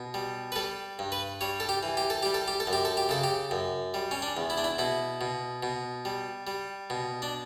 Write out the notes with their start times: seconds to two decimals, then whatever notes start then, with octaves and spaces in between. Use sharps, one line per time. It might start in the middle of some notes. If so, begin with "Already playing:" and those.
Already playing: B2
0.14 G3
0.52 B4
0.56 G3 A4
0.99 G2
1.12 B4
1.41 G3 C#5
1.60 A4
1.69 G4
1.83 E3
1.97 G4
2.10 A4
2.23 G3 G4
2.34 A4
2.48 G4
2.60 A4
2.67 F#2
2.73 G4
2.85 A4
2.97 G4
3.09 C#3 A4
3.24 G4
3.51 F#2
3.94 G3
4.11 C#4
4.22 D4
4.37 E2
4.50 E4
4.58 D4
4.64 E4
4.78 B2 E4
5.21 B2
5.63 B2
6.05 G3
6.47 G3
6.90 B2
7.22 D4